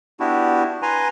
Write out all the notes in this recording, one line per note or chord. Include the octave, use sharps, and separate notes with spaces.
B3 D4 E4 F#4 G4
B4 G#5 A#5 C6